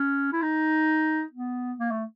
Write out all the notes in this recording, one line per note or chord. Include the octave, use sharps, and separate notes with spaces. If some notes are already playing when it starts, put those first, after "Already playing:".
Already playing: C#4
E4
D#4
B3
A#3
A3